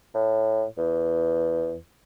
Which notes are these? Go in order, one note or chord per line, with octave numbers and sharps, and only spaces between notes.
A2
E2